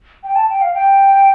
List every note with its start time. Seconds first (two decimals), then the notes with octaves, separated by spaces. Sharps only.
0.24 G5
0.36 A5
0.50 G5
0.62 F5
0.74 G5